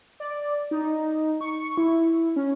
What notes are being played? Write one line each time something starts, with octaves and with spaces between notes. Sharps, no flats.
D5
D#4
C#6
E4
C#4